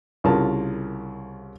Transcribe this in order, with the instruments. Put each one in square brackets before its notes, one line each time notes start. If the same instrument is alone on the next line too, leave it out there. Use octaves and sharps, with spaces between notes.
[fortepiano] C2 C#3 F4 A#4 A5